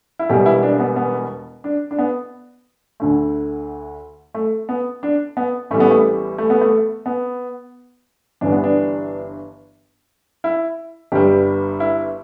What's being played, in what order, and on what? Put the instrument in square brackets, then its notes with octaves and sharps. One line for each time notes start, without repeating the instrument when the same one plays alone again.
[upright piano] E4
E1 E2 B2 G3 G4
E4
D4
B3
B3
D4
D4
B3
D2 D3 A3
A3
B3
D4
B3
A1 A2 E3 G3 A3
B3
A3
A3
B3
A3
B3
G1 G2 E3 G3 D4
B3
D4
E4
G1 G2 G3 G4
E4